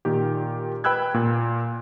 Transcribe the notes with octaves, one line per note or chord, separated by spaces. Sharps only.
A#2 D#3 G4
B4 G5 B5 E6 F#6 G#6
A#2